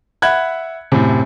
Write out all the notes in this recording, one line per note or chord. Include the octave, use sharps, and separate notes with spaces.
E5 F#5 B5 F#6 G#6
F#2 A2 C3